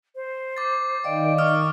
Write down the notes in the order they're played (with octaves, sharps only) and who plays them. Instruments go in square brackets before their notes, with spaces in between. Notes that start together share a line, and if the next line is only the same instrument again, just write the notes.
[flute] C5
[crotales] D6 A6
[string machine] D#3 [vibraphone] D5 D#5 F5 [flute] G5
[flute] C#6 [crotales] D#6 F6